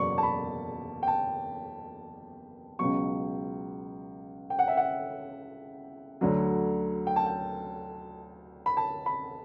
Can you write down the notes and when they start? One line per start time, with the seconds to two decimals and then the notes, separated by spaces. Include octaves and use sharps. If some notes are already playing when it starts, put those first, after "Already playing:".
Already playing: F#1 E2 B2 F#3 D5 C#6
0.18 A5
0.23 B5
1.03 G5
1.07 A5
2.79 C#2 B2 F#3 C#6
4.50 G5
4.59 F#5
4.67 E5
4.77 F#5
6.21 D2 D3 F#3
7.07 G5
7.16 A5
7.26 G5
8.66 B5
8.77 A5
9.06 B5